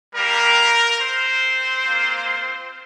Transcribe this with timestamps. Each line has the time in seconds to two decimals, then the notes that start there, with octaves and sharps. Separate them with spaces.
0.14 G3 A#3 G4 A#4
1.00 C4 C5
1.86 A#3 F4